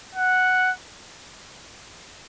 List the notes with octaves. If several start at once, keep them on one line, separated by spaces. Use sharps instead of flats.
F#5